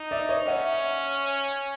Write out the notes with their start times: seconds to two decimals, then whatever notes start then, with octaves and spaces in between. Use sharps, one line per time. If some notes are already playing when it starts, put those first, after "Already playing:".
Already playing: D#4
0.11 D5 E5
0.29 C#5 D#5
0.47 C#4 E5 F#5